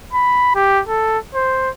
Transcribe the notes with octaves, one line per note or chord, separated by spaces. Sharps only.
B5
G4
A4
C5